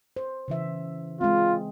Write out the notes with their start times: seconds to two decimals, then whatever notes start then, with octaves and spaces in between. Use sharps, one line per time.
0.16 C5
0.48 C#3 E3 E5
1.21 G#3 C4 F4